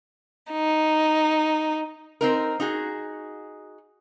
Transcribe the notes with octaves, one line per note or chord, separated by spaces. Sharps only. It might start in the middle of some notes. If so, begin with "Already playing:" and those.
D#4
C4 D#4 A#4
D#4 F#4 G#4